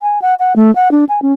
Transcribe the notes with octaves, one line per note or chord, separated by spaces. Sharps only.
G#5
F#5
F#5
A3
F#5
D4
G#5
C#4